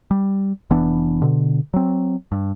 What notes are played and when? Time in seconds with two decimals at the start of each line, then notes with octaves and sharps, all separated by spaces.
0.11 G3
0.70 F1 E3 B3 D4
1.22 B2 D3
1.74 F#3 C4
2.32 G2